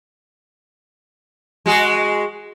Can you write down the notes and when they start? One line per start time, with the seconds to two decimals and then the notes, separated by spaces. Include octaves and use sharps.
1.66 G#3 F#4 G#4